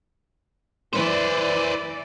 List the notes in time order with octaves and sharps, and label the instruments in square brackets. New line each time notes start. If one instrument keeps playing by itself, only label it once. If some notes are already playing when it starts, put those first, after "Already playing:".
[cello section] E3 D5 [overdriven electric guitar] B4 C5